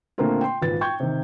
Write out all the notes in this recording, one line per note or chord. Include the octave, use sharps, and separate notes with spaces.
A#2 D3 A3 A#3 C4 F4
G5 C6
G#1 A#2 B4 A6
G5 C#6 G6 G#6
C3 D#3